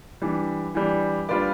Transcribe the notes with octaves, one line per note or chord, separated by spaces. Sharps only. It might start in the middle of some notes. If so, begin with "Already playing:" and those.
E3 G3 D4
E3 G3 D4
G3 D4 F4 B4 D5